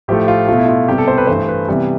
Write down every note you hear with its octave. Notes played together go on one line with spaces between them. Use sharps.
A2 F3 A3 G4
F4
B2 A3 F4
E4
F4
C3 G3 B3 G4
A4
C5
B4
G2 E3 A3 C5
B4
C3 E3 G3 B3